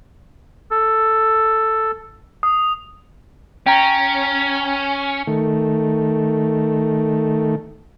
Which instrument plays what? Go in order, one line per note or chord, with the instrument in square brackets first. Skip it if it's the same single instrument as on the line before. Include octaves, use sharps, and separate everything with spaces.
[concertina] A4
[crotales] D#6
[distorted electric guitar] C#4 [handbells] G5 A#5
[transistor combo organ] D#3 A3